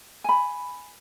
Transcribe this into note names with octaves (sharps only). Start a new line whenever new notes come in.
G#5 B5